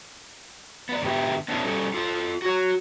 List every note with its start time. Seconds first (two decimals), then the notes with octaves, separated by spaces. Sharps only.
0.89 B3 D5
1.02 G#2 D3 B3 G4 G#4 E5
1.48 B3 C#4 D4 E4 F#4 G#4
1.64 G3 C#4 A4
1.94 F4 A4
2.42 F#4 C#5